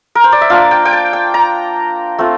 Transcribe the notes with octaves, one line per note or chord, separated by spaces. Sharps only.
A#4
C5
D5
E5
A#3 D4 F4 F5
G5
G5
A5
G5
A#5
A3 C4 F4